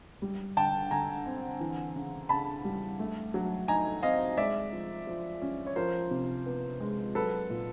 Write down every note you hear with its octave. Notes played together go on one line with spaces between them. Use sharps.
G3
D3 G5 A5
D3 G#5 A#5
C4
E3
C#3
C#3 A5 B5
G3
A3
F#3
D#4 G#5 A#5
C4 D#5 F5
G#3 D5 E5
F3
F3
C#4
C#5
F3 A#4 C5
C3
B3
G#3
F#3 A4 B4
A#2